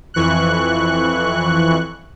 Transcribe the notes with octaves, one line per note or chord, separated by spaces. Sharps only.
F2 E3 C#6 F#6